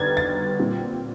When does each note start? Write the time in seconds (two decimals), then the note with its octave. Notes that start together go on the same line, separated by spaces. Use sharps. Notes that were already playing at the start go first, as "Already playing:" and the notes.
Already playing: D3 G3 B3 D#4 G#6 A6
0.17 A6
0.59 A#2 G3 C4